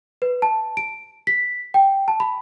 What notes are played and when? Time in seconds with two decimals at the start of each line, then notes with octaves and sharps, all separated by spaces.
0.22 B4
0.42 A5
0.77 D7
1.27 B6
1.74 G5
2.08 A5
2.20 B5